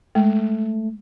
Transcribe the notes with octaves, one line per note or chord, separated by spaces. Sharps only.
G#3 A3